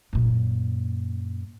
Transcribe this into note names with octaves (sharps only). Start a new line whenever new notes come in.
F#2 A#2